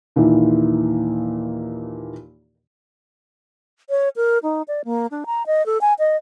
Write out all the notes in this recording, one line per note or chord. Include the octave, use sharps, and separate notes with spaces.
D#2 A#2 E3
C#5
A#4
D#4
D5
A#3
D4
A#5
D#5
A4
G#5
D#5